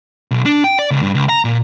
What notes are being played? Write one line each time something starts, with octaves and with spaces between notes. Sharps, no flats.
B1
D4
G5
D5
C#2
G2
C#2
A#5
A#2